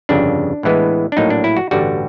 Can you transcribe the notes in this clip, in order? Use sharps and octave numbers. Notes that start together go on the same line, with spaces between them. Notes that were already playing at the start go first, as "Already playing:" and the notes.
G1 F2 C#3 D4
A2 E3 G#3 B3
D4
A#1 A2 F#3 A#3 D#4
D4
E4
F#4
A1 G2 D3 G3 F#4